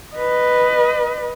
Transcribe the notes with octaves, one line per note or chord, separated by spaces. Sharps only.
B4 D#5